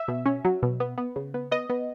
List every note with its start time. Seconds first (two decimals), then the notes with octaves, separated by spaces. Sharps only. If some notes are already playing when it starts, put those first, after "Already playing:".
Already playing: E5
0.08 B2
0.26 C#4
0.45 F#3
0.63 B2
0.80 B3
0.98 B3
1.16 C#3
1.34 B3
1.51 B3 D#5
1.70 B3